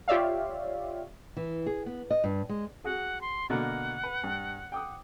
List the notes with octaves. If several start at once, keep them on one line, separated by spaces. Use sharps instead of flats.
F4 G4 C#5 D5 E5 F5
E3
G#4
B3
D#5
G2
G#3
F#4 G#4 F#5
C6
B2 D3 A#3 F#5
B4
G2
G5 D6 D#6